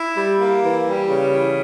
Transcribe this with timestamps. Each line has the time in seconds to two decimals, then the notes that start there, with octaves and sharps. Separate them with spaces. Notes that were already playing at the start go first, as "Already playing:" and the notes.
Already playing: E4
0.15 G3
0.39 A#3
0.62 E3
0.86 G3
1.09 C#3
1.32 E3